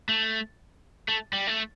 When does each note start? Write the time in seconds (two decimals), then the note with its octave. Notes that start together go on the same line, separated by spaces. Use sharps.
0.09 A3
1.08 A3
1.33 G3
1.47 A3